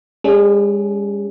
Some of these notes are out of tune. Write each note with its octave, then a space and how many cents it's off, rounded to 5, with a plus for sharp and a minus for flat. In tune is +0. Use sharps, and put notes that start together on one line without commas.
G#3 -45 C#4 +25 G#4 +25